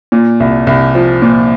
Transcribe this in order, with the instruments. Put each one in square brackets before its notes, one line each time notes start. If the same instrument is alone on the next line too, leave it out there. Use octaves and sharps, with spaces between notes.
[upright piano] A#2
C2
C2
F3
A#2